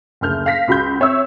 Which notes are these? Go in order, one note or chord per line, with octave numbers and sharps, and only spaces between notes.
F#1 D2 F6 G6
F5 F6 A#6 B6
C#2 F#4 B5 C6 G6
C4 C#5 E5 E6